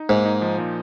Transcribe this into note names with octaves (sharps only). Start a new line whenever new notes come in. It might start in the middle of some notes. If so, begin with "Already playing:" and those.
Already playing: D#4
G#2 A#3
D#4
F3
A#2